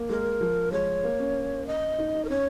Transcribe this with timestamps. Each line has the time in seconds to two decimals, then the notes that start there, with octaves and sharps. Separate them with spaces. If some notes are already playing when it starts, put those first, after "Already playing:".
Already playing: A#3
0.09 G#3 A#4
0.41 F3
0.72 G#3 C#5
1.03 A#3
1.19 C#4
1.67 D#5
1.98 D#4
2.15 D#4
2.25 A#4
2.29 C#4 C#5